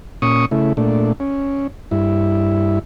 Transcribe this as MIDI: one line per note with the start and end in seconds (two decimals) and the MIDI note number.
0.22 0.45 46
0.22 0.45 61
0.22 0.45 85
0.22 0.45 87
0.51 0.73 49
0.51 0.73 57
0.51 0.73 64
0.77 1.12 46
0.77 1.12 57
0.77 1.12 62
1.20 1.67 61
1.91 2.79 43
1.91 2.79 64